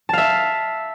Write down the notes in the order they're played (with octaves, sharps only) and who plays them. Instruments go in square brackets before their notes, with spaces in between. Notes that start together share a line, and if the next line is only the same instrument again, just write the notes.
[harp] A5
F5
E5